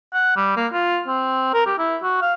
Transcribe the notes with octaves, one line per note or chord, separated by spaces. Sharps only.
F#5
G3
A#3
F4
C4
A#4
G4
E4
F#4
F5